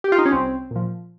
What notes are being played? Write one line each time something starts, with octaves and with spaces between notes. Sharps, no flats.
G4
F4
D#4
C#4
C2 C4
A#2 F3